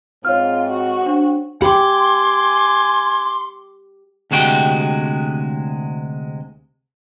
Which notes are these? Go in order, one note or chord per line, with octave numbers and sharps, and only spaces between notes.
G#2 C4 F4 C#5 F6
F#4
C4 D4 C#6
G4 G#5 B5 C6 D6
D2 C3 G#3 F#4 G5